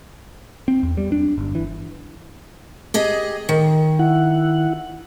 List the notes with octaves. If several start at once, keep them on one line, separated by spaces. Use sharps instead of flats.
C4
E2
G3
D4
G1
E3
G4 G#4 D#5
D#3
E4 F#5